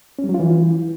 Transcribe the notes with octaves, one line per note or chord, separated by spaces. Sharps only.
C#4
G3
F#3
F4
E3